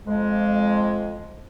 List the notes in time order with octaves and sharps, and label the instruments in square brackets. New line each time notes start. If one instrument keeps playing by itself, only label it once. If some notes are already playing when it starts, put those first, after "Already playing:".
[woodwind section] F2 G#3